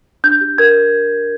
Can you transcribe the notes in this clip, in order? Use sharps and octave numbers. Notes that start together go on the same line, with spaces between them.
D4 G6
G4
A#4 G#6